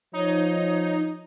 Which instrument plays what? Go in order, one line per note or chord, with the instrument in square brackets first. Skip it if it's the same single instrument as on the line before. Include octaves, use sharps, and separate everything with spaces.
[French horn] F3 [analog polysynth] D#4 [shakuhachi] C#5